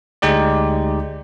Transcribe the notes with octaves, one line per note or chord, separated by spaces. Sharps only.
D2 G#3 D#4 G4 D5